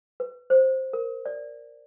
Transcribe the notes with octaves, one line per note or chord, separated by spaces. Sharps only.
B4
C5
A#4
D5